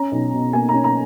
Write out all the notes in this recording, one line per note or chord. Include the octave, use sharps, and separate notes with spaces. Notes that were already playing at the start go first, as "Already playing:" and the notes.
Already playing: C#4 A#5
B1
B2
A#3 G#5
C#4 A#5
A#5